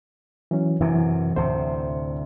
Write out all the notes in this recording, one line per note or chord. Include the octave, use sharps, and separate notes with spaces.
E3 F#3 C#4
F#2 C3 E3
D2 A2 C3 C5